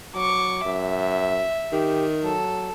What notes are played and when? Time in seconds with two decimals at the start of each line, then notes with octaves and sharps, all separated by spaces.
0.15 F#3 C#6 D6
0.65 F#2 E5
1.72 D#3 G4
2.23 F#3 A4